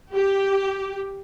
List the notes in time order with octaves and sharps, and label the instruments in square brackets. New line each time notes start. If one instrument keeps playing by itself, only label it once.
[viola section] G4